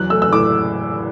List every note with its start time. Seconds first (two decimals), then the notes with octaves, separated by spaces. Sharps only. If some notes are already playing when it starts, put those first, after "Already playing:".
Already playing: E2 F#3 F#6
0.10 A3 E6
0.22 E6
0.33 A2 D6